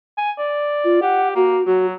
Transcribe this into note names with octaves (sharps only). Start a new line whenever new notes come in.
G#5
D5
F4
G4 F#5
A#3 F#4
F#3 F#4